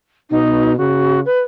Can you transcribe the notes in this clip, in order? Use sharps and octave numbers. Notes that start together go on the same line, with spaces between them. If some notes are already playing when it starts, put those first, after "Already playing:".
B2 D#4
C#3 F#4
B4